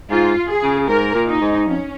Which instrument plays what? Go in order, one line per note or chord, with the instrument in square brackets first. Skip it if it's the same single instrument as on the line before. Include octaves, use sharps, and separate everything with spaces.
[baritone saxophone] G#2 [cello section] F4
[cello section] G#4
[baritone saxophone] C#3
[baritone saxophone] G#2 [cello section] A#4
[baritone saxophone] A#2
[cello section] D#4
[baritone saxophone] G#2
[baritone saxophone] F2 [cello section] C#4